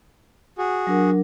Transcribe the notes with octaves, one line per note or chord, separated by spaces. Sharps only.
F#4 G#4
F#3 D4 A#4